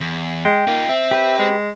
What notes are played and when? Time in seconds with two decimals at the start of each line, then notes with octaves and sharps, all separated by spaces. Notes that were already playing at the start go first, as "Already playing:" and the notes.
0.01 E2
0.45 G#3 G5
0.67 A#3 D#4 F4
0.89 C4 E5
1.11 G4 B4
1.39 G#3